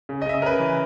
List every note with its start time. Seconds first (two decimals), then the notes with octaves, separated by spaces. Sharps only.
0.09 C#3
0.22 D#5
0.26 C#3 E5
0.34 D#5
0.42 C#3 A#4 B4
0.59 E3